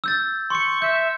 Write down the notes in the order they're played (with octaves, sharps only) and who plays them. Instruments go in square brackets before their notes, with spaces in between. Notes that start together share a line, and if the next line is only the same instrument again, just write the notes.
[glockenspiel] E6 G6 A6
[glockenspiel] C6 C#7 [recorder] C#6
[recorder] E5 [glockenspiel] G6